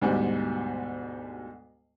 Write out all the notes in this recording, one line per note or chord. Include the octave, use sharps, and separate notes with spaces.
D2 G#2 B2 G3